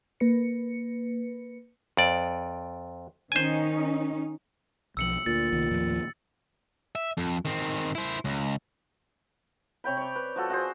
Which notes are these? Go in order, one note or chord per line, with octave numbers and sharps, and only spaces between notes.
A#3 B4 C#7
F2 D5
D#3 C#4 D#4 C5 G#5
B1 F3 E6 C#7 F#7
D2 A#2 A6
C2 D#3
D#2 A2 F3
E5
F2
D#3 C4
E4 C5
C#2
C3 C#5 G5 B5
C#5 D5
B4
F3 F#4 A4
F#4 G#4 C5